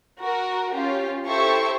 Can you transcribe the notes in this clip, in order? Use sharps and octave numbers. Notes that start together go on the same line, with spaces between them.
F#4 A#4
C#4 F4 G4
E4 G4 A4 C5 E5 C#6